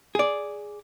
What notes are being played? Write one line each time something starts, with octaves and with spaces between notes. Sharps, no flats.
G#4 D5